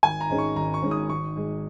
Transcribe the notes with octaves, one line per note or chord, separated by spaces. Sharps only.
G#1 G#5
A#5
G#2 G#3 C#4
C#6
G#1 A#5
C#6
G#2 G#3 C#4
D#6
G#1 C#6
G#2 G#3